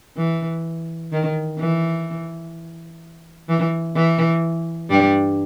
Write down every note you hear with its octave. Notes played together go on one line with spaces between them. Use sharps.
E3
D#3
E3
E3
E3
G2 G3